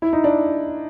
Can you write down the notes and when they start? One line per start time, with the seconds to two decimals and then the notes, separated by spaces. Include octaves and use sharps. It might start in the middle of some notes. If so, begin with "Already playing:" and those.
0.02 E4
0.13 D#4
0.24 D4